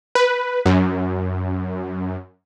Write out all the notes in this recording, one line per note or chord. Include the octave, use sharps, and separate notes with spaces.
B4
F#2